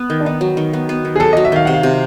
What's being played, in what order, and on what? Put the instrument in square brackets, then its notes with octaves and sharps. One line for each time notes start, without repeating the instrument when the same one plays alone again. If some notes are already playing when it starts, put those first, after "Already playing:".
Already playing: [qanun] B3
D#3
[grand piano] D4
[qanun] B3 [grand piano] D#4
[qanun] F#3
D#3
B3
B3
D#3
[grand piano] G#4
[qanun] F#3 [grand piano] A4
[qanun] F#3 [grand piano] D#5
[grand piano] E5
[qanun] D#3 [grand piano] F5
[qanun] C3 [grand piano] F#5
[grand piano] F5
[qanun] C3